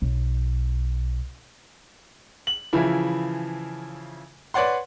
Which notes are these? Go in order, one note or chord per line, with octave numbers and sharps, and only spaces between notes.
B1
F#7
C#3 E3 F3 E4
B4 C#5 D5 F#5 C6